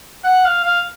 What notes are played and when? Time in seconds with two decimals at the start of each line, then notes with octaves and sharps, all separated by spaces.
0.24 F#5
0.45 F5
0.64 F5